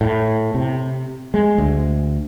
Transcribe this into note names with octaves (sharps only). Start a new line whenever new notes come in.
A2
C3
G#3
D2